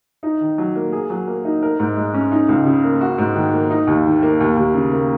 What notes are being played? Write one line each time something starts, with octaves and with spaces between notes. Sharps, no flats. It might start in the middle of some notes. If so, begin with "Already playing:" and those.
D#4
D#3
F#3
A#3
G#4
F#3
A#3
D#4
A#4
G#2
G#3
C#4
D#4
C#2
C#3
A#3
F#4
G#2
D#3
A#3
D#4
D#2
D#3
A#3
D#2
D#2
C#3
A#3